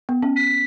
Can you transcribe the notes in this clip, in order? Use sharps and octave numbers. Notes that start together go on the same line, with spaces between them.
B3
C#4
B6